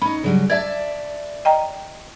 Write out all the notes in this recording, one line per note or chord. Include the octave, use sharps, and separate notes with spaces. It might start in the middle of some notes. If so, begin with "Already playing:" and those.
C#4 D#4 B5
C#3 F#3 G3
D5 E5 A5 G#6
D#5 G5 A#5